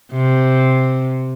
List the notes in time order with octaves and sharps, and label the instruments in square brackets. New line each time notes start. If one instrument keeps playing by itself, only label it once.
[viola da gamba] C3